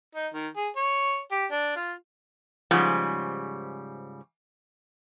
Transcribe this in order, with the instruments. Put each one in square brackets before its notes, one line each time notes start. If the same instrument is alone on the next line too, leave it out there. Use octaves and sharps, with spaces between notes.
[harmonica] D#4
D#3
G#4
C#5
G4
D4
F4
[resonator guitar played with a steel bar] G#2 C#3 F3 G3